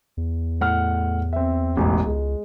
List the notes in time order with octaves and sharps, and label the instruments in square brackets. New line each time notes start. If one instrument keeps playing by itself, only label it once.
[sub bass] E2
[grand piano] A2 F#5 F6
C4 E5
E1 A1
[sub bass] C#2 [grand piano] G#3